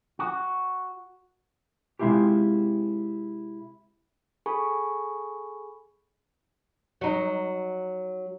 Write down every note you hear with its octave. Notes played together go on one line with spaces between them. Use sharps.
F#4
C3 G#3 C4 E4 F4 G4
G#4 A4 G#5 B5 C#6
F#3 D#4